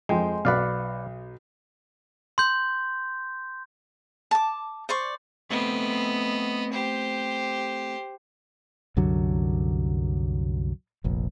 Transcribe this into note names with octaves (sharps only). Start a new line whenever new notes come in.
F2 G#3 G5 C6
B1 B4 D5 F5 F#5
C6 G6
A5 D6
C5 D5 C#6
A3 B3 C4 D#5
G4 C5
C2 F#2 D3 F#3
F1 A#1